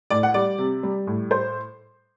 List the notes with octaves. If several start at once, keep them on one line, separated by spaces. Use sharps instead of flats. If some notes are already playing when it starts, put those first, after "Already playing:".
A2 D5
F#5
G3 D5
C3
G3
A2
C5